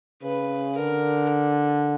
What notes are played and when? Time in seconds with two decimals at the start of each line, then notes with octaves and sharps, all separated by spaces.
0.23 C#3 B4
0.77 D3 A#4